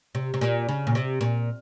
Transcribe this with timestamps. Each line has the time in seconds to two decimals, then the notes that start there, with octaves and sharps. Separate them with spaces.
0.15 C3
0.34 C3
0.41 A#2
0.69 C#3
0.87 A#2
0.95 C3
1.21 A#2